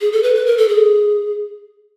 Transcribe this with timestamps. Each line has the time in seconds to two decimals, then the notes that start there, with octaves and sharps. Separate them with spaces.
0.01 G#4
0.12 A4
0.23 B4
0.35 B4
0.46 A#4
0.58 A4
0.68 G#4